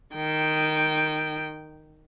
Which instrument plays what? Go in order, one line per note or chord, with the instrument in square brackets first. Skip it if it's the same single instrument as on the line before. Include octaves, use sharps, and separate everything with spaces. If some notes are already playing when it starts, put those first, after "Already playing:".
[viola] D#3 G5